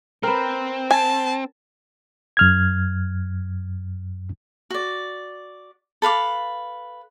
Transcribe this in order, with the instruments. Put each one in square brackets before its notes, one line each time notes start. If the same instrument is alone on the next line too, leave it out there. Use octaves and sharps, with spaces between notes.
[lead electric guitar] C4 [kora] A#4 B4
[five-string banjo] G#5 [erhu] A5
[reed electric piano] F#2 F6 G#6
[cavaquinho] F#4 D5
A4 B4 F5 D6